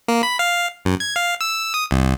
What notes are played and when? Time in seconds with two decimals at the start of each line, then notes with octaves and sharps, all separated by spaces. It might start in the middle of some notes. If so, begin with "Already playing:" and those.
0.08 A#3
0.23 B5
0.39 F5
0.85 F#2
1.00 G#6
1.16 F5
1.41 E6
1.74 D#6
1.91 C2